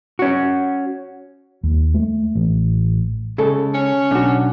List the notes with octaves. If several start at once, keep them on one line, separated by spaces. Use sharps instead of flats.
C#4 F#4
D#2
A3
A1
C#3 G#3 A4
C#4 C#5
B1 D4 F#4